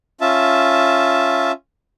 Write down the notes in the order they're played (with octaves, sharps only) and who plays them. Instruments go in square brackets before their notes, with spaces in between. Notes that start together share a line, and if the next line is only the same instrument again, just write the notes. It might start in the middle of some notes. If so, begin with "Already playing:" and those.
[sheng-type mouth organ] C#4 F4 E5 A5